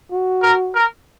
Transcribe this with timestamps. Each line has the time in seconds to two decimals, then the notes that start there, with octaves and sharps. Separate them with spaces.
0.12 F#4
0.42 A#4
0.75 A#4